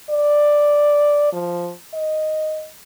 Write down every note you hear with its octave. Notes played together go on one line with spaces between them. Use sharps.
D5
F3
D#5